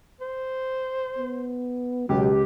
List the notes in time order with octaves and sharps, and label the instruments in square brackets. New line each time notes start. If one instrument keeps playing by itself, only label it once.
[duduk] C5
[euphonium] B3
[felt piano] C#2 [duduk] B2 [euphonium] F#3 [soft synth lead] G4